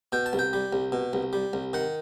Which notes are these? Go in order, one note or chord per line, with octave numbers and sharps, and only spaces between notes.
B2 G5
A5
C2
G5
G3
C2
B2
C2
G3
C2
D#3 F#5